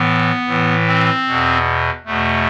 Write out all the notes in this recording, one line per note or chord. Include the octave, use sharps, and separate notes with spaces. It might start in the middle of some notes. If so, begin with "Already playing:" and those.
Already playing: A2 E3 B3
A2 E3
C4
E2 B2
E2 B2 A3